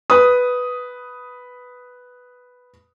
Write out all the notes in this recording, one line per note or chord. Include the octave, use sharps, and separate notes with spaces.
B4 D#6